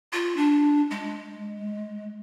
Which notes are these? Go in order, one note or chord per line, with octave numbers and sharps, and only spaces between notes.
F4
D4
G#3